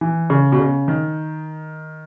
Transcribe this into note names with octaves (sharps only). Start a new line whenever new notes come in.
E3
C#3
B2
C#3
D#3